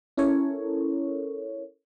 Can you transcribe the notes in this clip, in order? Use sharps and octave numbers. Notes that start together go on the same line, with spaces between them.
C#4 E4 A4 A#4 C#5